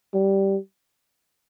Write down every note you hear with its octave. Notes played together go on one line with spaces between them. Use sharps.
G3